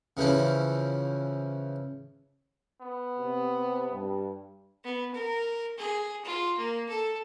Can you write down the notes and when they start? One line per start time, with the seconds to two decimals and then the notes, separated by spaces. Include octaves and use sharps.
0.17 C#3 E3 F3 C#4
2.81 B3
3.18 C3
3.91 G2
4.84 B3
5.15 A#4
5.78 G#4
6.25 F4
6.58 A#3
6.89 A4